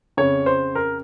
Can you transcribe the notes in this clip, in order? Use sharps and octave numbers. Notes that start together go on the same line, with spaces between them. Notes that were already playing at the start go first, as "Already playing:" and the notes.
F2 C#3 C#5
C5
A#4